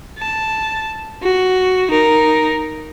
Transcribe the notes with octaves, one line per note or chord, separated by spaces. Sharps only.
A5
F#4
D#4 A#4